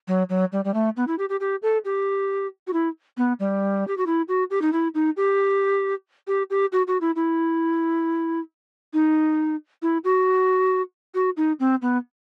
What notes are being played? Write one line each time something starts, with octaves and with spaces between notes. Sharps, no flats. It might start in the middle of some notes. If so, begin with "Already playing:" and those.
F#3
F#3
G3
G3
A3
B3
E4
G4
G4
G4
A4
G4
F#4
E4
B3
G3
G4
F#4
E4
F#4
G4
D#4
E4
D#4
G4
G4
G4
F#4
F#4
E4
E4
D#4
E4
F#4
F#4
D#4
C4
B3